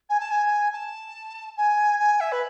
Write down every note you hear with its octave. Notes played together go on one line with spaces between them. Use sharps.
G#5
A5
G#5
A5
G#5
G#5
E5
B4